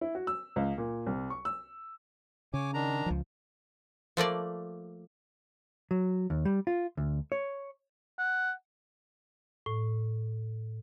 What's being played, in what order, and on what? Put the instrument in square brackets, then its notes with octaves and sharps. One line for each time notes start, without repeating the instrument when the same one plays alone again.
[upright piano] E4
F#4
E6
C#2
A#2
C2
C#6
E6
[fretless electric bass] C#3 [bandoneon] C#5 G#5 D6
[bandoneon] D#3 D4 A#5
[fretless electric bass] C#2 F3
[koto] F3 A3 A#3 D5
[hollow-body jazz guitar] F#3
D#2
G3
F4
D2
C#5
[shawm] F#5
[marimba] A2